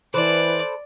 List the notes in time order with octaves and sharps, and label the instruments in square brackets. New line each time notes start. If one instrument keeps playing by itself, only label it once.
[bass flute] E3 [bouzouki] A4 B4 C5 [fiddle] D5